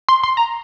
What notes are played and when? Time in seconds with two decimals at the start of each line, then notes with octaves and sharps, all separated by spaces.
0.09 C6
0.23 C6
0.37 A#5